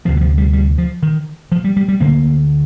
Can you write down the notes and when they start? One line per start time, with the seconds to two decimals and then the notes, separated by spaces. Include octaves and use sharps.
0.05 C3 F3
0.08 D2
0.17 G3
0.21 F3
0.38 G3
0.53 G3
0.78 F3
1.03 D#3
1.52 F3
1.64 G3
1.77 G3
1.88 G3
2.00 D2 D3 A#3